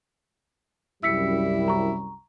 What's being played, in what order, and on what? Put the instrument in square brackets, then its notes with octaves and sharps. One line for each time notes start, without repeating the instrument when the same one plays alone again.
[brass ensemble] C2 F#2 G3 [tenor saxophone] E4 [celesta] E6 B6 C#7
[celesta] A#5 C#6